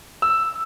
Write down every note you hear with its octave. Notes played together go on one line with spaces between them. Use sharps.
E6